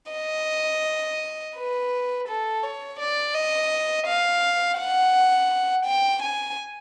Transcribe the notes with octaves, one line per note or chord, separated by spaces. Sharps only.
D#5
B4
A4
C#5
D5
D#5
F5
F#5
G5
G#5